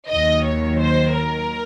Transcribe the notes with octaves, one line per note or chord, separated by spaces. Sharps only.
D#2 D#3 F#3 D#5
C#5
C5
A#4